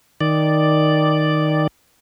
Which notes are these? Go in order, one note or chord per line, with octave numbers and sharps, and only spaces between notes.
D#3 D5